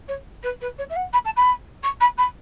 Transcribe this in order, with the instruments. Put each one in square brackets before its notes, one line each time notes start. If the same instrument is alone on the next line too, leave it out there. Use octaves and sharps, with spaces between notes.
[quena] C#5
B4
B4
C#5
E5
F#5
B5
A5
B5
C#6
B5
B5